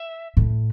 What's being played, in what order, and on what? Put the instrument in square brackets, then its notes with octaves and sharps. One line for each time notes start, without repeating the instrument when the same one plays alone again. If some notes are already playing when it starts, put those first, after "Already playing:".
Already playing: [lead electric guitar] E5
[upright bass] A2